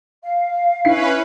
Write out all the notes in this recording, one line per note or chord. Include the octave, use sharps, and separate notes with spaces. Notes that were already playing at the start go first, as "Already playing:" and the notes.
F5
C#4 E4 B4 C7